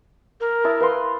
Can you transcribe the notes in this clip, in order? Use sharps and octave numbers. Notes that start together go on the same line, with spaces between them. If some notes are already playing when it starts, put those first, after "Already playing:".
A#4
E4 A5 D#6
B4 F5 C6